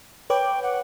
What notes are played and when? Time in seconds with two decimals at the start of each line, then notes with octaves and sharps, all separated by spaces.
0.30 B4 C#5 G5 D6
0.63 F#5